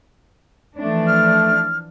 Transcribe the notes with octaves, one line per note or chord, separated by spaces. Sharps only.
E3 F3 A3 D4
F6